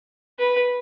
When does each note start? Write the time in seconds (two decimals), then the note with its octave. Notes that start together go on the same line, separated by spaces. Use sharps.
0.39 B4